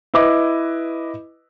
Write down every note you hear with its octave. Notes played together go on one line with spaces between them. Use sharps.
E4 B4 D#5 D6